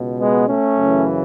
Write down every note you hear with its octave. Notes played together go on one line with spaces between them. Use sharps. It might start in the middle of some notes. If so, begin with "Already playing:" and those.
Already playing: C#2 B2
G#3 B3
A3 C#4
F#2 C#3 E3